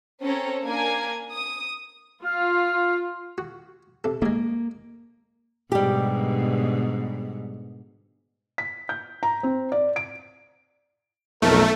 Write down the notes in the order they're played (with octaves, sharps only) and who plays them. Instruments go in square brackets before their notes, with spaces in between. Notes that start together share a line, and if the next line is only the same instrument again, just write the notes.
[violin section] C4 C#4 A4 C#5 A#5
A#3 D4 A#4 G#5 G#6
D#6
[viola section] F4 [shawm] F5
[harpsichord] F#4
C3 A4
[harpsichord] G#2 G#3 [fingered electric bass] A#3
[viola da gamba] G#2 B2 D3 [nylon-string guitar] G3 G4
[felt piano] B6
G6
A#5
C4
D5
D7
[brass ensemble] B1 F2 A#4 [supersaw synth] A3